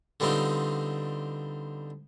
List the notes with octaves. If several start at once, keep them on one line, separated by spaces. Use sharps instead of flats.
D3 G3 B3 C4 D#4 F4